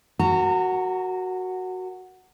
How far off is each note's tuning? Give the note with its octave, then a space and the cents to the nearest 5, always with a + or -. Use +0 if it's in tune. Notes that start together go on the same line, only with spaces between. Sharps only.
F#4 +0 A#4 +0 A#5 -40